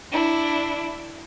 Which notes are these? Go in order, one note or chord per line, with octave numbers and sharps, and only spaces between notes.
D4 E4